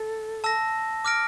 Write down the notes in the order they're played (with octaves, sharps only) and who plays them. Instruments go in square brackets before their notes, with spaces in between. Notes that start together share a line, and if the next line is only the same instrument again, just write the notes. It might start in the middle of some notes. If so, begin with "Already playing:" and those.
Already playing: [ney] A4
[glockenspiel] A5 E6 A#6
D6 F6 A#6 D7